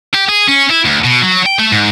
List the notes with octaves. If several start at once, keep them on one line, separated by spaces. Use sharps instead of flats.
G4
G#4
C#4
E4
D2
B2
F#3
G5
A3
G#2